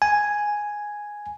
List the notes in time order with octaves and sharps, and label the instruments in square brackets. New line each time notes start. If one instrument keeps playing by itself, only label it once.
[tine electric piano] G#5